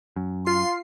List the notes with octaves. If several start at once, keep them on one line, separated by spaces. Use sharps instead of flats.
F#2
F4 C6 C7